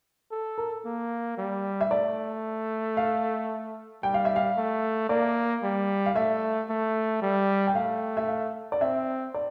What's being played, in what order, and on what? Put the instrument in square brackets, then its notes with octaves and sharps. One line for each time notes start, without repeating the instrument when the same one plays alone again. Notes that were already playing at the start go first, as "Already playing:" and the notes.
[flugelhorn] A4
[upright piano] A#4
[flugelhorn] A#3
G3
[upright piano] E5
[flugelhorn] A3 [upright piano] D5
[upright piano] F5
[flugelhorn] G3 [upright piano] G5
[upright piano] F5
E5
F5
[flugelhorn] A3
[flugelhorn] A#3 [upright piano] D5
[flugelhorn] G3
[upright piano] F5
[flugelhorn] A3 [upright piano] E5
[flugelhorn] A3
G3
[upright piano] G5
[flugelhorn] A3 [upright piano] F5
[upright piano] E5
F5
D5
[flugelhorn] C4 [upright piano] E5
[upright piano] D5